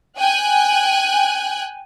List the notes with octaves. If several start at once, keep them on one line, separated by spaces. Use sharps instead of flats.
G5 G#5 F#6